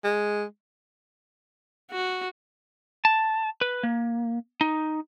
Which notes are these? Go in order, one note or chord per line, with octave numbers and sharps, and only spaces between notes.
G#3
F#4
A5
B4
A#3
D#4